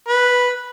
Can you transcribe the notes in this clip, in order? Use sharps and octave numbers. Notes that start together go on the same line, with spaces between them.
B4